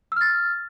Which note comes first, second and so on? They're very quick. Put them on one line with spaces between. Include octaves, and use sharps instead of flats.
E6 F6 A6